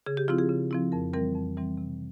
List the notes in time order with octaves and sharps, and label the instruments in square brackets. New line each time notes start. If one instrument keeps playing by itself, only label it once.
[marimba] C#3 G#4
G4
F3 C4 E4 F4
G#4
C#3
F3 C4 E4
F2 A#4
E3 G3 C4 A#4
F2
E3 G3 C4
C3